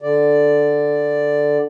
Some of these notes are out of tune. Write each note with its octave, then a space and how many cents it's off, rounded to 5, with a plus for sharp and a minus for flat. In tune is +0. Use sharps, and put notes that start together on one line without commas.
D3 +0 D5 +0